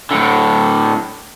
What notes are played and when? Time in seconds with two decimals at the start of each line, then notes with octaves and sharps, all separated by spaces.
0.11 A2 D3